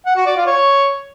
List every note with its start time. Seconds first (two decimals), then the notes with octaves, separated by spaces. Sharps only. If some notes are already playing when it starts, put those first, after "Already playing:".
0.06 F#5
0.16 F#4
0.26 D5
0.36 F4
0.47 C#5